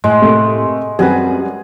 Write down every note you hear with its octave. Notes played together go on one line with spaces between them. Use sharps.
A2 G#3
C3 A3 A#3
F#2 G3 C4 F#4 G#4 B4